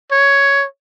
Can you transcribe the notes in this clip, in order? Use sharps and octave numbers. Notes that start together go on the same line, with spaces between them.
C#5